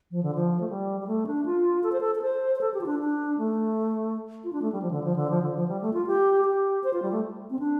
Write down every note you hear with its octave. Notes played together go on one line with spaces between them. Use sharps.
F3
D3
F3
A3
G3
G3
A3
D4
F4
A4
C5
A4
A4
C5
C5
A4
G4
F4
D4
D4
A3
F4
D4
A3
G3
F3
D3
F3
D3
F3
D3
F3
G3
A3
F4
G4
G4
C5
F4
G3
A3
C4
D4